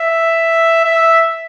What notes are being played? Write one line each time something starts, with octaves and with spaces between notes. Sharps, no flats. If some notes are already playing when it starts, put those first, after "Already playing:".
Already playing: E5
E5